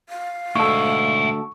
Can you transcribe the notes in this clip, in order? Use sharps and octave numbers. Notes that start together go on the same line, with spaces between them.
F5
D2 G#2 E4 A4 C#6